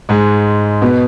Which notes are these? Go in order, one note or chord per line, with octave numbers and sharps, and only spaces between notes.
G#2 G#3
B2 B3